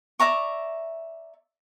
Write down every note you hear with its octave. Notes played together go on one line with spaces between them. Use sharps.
D5 E5 A#5 C#6